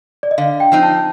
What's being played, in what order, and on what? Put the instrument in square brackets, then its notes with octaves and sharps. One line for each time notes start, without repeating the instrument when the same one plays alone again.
[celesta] D5
D#5
[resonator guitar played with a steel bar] D3 [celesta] F5
[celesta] G5
[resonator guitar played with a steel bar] F3 C4 D#4
[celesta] A5